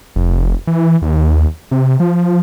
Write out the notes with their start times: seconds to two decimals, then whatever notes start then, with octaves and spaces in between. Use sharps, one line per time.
0.16 F1
0.67 E3
1.02 D#2
1.71 C3
2.00 F3